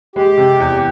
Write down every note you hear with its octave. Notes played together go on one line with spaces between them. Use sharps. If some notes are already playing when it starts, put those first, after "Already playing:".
G#3 G4
C3
E2